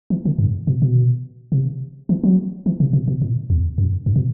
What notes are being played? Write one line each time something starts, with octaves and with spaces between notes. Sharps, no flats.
E3
D3
G2
B2
B2
C3
E3
F#3
E3
C3
B2
B2
A2
E2
F#2
G2
B2